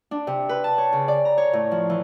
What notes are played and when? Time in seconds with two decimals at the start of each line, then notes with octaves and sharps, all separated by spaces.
0.11 D4
0.27 C3
0.49 B4
0.64 A5
0.78 C#5
0.92 C#3
1.08 D5
1.25 A#5
1.38 C#5
1.53 A2
1.71 F3
1.90 E3